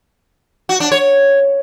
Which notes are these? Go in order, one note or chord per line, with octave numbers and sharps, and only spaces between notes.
F#4
D4
C#5